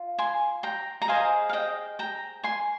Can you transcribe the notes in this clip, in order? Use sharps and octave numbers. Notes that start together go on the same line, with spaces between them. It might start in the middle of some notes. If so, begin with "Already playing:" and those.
Already playing: F4
G#5 C6
G5 A#5
A#5
G#4 C5 D#5 F5 G#5
F5
D#5 G5
G5 A#5
G#5 C6